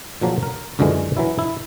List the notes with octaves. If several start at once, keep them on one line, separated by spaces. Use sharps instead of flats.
A#2 C#3 F3 F#3 A#3
A#4
C#2 F#2 D3 E3 G#3
E3 F#3 E4
E4